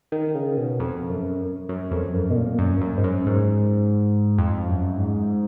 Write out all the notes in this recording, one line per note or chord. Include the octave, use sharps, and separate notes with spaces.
D#3
C#3
B2
F2
F#2
F#2
F2
F#2
B2
A#2
F#2
F#2
G#2
F#2
G#2
F2
F#2
G#2